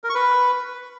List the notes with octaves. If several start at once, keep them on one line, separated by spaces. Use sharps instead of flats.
A#4
C#6
B4